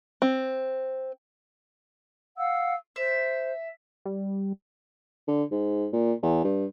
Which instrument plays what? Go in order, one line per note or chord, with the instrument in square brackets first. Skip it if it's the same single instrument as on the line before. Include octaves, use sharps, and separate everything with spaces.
[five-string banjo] C4
[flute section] F5 F#5 E6
[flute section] C5 [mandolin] E5
[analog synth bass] G3
[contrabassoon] D3
G#2
A#2
E2
G2